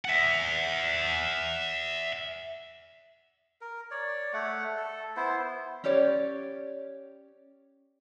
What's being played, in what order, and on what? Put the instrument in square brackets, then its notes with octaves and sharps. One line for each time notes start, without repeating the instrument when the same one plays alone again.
[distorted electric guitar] E5 F#5
[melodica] A#4
C#5 D5
A3 F#5
A4
B3 E4 C5
[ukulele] C#4 G4 C#5 D5